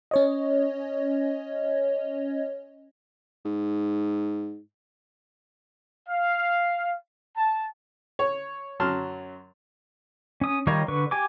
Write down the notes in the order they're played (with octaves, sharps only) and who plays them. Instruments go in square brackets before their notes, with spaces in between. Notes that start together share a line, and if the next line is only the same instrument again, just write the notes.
[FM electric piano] C#4 C#5 D#5
[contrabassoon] G#2
[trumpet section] F5
A5
[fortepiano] C#5
F#2 F#3 A5 C6 F6
[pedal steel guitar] C#4 D#6
D#3 G3 D#4 F4 C#5
D3 B4 C#6
G4 G#5 D6